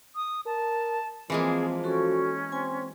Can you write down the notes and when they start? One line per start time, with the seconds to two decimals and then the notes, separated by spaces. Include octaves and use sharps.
0.16 D#6
0.46 A#4 A5
1.30 E3 F3 G#3 A#3 C4 G#4
1.84 C#4 F#4 A4 C#6
2.52 C4 G#5 C6